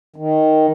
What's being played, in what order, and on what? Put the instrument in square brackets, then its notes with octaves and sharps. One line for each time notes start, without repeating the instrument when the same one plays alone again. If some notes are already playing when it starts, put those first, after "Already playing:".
[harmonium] D#3